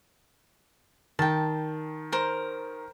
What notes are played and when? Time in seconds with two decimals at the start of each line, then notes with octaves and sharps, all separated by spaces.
1.19 D#3 G5 A5
2.12 A#4 C5